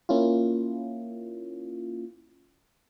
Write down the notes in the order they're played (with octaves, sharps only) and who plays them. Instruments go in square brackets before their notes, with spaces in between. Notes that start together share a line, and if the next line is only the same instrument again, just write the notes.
[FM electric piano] A#3 C#4 E4 F4